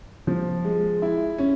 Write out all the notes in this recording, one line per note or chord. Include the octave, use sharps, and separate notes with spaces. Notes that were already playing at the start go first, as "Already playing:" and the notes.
F3
G#3
E4
C#4